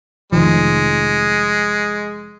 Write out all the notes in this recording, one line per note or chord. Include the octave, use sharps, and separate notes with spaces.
F1 D#3 F3 G#3